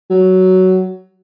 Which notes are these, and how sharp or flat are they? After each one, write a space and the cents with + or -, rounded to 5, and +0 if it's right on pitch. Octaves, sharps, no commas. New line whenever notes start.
F#3 +10